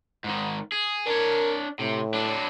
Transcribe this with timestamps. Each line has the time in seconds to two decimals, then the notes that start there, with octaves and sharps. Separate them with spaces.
0.24 G#2 D#3
0.72 G#4
1.06 D4 A#4 C#5
1.79 A2 C3
2.14 F#3 D4